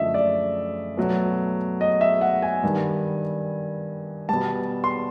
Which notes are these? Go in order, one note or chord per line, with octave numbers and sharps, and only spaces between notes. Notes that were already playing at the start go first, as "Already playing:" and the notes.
Already playing: F#2 D3 F3 A3 D#5 E5
D5
B2 F#3 A3
D#5
E5
F#5
G#5
G2 D#3 G3
B2 G3 A5
C6